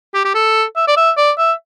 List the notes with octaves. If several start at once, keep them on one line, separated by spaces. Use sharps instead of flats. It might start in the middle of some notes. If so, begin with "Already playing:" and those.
G4
G4
A4
E5
D5
E5
D5
E5